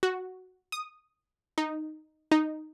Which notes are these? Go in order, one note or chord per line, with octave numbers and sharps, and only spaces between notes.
F#4
D#6
D#4
D#4